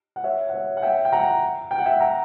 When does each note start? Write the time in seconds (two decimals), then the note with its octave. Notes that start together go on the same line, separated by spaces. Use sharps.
0.16 F#5
0.24 C#5 E5
0.49 F#5
0.53 C#5 E5
0.77 F#5
0.83 E5 G5
1.05 G5
1.13 F#5 A#5
1.71 G5
1.78 F#5
1.85 E5 G5
2.00 F#5 A#5